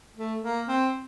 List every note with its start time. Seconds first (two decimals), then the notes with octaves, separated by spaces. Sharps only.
0.16 A3
0.42 A#3
0.68 C4